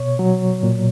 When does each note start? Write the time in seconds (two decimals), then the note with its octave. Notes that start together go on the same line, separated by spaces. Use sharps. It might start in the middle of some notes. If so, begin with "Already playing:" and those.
Already playing: B2 C#5
0.19 F#3
0.63 A#2